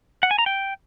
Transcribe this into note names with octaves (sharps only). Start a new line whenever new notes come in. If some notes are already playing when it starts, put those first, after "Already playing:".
F#5
G#5
A#5
G5